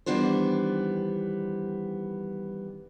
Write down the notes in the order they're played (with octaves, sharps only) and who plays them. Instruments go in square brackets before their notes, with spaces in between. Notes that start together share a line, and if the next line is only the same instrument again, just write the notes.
[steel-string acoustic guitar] D#3 E3 G3 B3 D4 C5